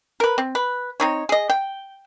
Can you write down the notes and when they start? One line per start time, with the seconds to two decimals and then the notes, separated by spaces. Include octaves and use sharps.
0.20 A#4 B4
0.38 C4
0.55 B4
1.00 C4 D#4 C#5
1.29 G#4 D#5
1.50 G5